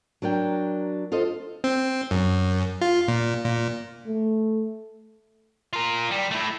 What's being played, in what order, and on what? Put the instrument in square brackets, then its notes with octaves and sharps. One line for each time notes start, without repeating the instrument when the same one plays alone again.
[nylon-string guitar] F#3 D4 A#4 G5
F4 A4 C5 D#5
[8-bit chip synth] C4
F#2
F4
A#2
A#2
[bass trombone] A3
[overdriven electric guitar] F4 A#4
G3
A3 E4